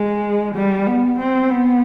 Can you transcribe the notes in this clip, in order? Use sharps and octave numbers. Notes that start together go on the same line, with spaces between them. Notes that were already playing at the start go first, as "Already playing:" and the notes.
Already playing: G#3
G3
B3
C4
B3